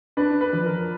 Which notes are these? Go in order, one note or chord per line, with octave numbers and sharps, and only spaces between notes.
D4 B4
B4
F3
A#4